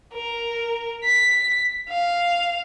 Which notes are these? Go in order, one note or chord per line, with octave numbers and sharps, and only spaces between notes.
A#4
B6
F5